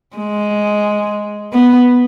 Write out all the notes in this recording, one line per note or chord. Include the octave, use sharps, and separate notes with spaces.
G#3
B3